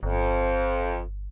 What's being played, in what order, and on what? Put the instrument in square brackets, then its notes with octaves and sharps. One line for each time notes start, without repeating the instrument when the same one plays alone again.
[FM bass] G1 [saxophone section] F2